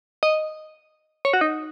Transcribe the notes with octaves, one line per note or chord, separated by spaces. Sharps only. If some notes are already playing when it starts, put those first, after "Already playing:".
D#5
C#5
F#4
D#4